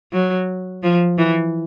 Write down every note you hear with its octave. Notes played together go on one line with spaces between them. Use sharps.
F#3
F3
E3